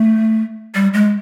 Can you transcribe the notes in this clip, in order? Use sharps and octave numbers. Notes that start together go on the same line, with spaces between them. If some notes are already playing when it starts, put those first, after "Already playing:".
Already playing: A3
G3
G#3